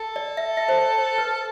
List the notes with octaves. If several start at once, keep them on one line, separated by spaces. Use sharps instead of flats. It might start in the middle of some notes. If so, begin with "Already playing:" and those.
Already playing: A4
D5
E5
E5
C5
D5
C5
B4